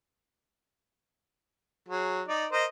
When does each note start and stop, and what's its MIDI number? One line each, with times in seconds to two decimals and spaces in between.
1.88 2.21 54
1.88 2.21 68
2.28 2.46 63
2.28 2.46 74
2.52 2.65 70
2.52 2.65 72
2.52 2.65 75